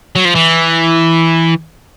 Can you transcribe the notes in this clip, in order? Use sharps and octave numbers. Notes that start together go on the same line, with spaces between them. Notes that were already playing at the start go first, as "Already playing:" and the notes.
F#3
F3
E3